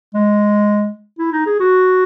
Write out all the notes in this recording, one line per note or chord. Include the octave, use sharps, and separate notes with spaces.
G#3
E4
D#4
G#4
F#4